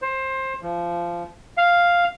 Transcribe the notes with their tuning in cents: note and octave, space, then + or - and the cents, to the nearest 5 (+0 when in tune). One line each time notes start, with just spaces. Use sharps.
C5 +20
F3 -20
F5 +0